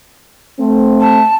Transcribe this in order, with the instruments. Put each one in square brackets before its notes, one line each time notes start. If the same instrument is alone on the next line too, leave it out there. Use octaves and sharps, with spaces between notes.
[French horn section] A3 C4
[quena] A5